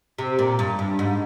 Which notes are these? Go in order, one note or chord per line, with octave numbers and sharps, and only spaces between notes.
C3
A#2
G2
G2
G#2